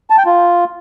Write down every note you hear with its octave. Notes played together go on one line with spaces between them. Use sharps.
A5
G5
F4